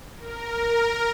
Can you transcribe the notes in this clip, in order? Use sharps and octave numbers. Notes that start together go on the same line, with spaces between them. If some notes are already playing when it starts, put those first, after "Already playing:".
A#4